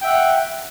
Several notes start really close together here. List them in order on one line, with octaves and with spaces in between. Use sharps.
G5 E5 F#5